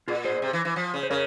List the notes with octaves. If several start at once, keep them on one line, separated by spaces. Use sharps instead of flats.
A#2 F4 G#4
G#4 C5
C3
E3
E3
F3
C#3
C5
C#3 A#4 C#5